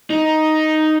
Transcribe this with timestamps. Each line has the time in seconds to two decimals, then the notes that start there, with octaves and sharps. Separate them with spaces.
0.10 D#4